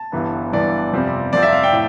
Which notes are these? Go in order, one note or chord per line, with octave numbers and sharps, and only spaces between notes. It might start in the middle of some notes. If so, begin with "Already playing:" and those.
Already playing: A5
G1 G2 E3 B3
G1 G2 E3 B3 D5
F2 C3 G3 C4 F4
F2 C3 G3 C4 F4 D5
E5
F5
G5
A2